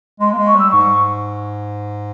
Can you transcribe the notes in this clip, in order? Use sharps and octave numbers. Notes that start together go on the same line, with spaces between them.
G#3 C6
A#3
G#3
C#6
G3 E6
G#2 C#6